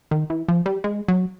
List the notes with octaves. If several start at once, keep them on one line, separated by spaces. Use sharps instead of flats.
D#3
E3
F3
G3
G#3
F#3